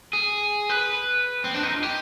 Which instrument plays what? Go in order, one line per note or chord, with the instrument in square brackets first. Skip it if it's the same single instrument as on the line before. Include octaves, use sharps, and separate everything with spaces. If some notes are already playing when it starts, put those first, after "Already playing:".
[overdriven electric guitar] G#4
B4
C4
D4
D#4
F4
G4